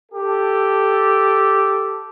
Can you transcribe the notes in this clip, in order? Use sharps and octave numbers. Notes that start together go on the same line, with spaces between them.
G4 A4